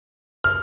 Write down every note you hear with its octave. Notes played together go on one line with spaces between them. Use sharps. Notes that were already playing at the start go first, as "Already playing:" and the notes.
F6